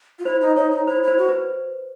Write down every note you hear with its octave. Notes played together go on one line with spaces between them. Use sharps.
F4
E4 C5
D#4
D#4 C#5
D#4
E4 C5
E4 C5
F#4
B4